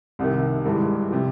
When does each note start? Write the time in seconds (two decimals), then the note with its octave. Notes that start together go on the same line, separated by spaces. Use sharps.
0.19 C2 C3 D#3
0.65 G2 E3 G#3
1.11 C3 F3